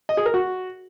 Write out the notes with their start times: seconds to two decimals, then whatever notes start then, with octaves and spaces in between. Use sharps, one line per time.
0.09 D#5
0.17 G#4
0.26 A#4
0.34 F#4